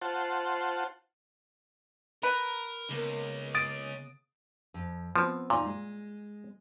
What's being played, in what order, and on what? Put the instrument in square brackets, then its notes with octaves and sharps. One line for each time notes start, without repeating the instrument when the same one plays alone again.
[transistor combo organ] F4 C5 F#5 A5
[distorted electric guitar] A#4 [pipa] B4
[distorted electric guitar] C#2 [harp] C#3 A#3 B3
[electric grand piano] D#6 A6 D7
[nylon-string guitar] F2
[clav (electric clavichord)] F3 [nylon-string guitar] B3 C4 B4
[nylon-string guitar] E2 D#4 [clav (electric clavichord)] A#2
[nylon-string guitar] G#3